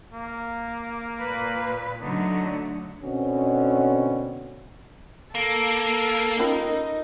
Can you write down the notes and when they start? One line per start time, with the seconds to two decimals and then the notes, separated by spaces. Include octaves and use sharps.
0.13 A#3
1.21 A#2 B4
2.02 D3 F#3 A3 D#4
3.02 B2 D3 C4 C#4 F#4
5.35 A#3 A4
6.39 C#4 D#4 F4 A#4